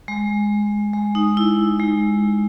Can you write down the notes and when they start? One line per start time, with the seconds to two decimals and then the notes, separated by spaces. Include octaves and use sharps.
0.08 G#3
0.93 G#3
1.15 D#4
1.37 E4
1.79 G#3